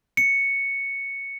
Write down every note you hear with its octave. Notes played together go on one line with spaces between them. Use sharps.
C#7